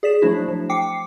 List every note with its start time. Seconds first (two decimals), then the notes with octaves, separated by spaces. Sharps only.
0.03 G#4 D5 B6 E7
0.22 F3 F#3 A3 D4 E4 F#4
0.48 F3
0.69 G5 D6 C7 C#7